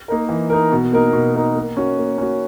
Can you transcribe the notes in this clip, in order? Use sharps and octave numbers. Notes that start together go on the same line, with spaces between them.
A#3 D#4 A#4
E3
A#3 D#4 A#4
B2
A#3 D#4 A#4
B2
A#3 D#4 A#4
A#3
C#4 F#4
A#3
C#4 F#4